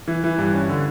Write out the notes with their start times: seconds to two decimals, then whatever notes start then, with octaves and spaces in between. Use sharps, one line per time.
0.08 E3
0.24 E3
0.38 G2
0.54 C#4
0.69 D3